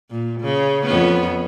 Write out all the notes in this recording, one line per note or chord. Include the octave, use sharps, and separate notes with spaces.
A#2
C#3
F2 B3 C#4